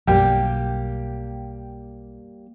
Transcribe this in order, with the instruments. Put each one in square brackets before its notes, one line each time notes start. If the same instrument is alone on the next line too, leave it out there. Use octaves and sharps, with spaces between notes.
[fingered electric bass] B1 F#2 [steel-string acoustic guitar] G3 A#3 [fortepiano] G4 G5